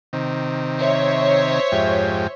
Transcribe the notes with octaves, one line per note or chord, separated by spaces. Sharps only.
C3 D#3
C5 C#5 E5
F2 G#2 G4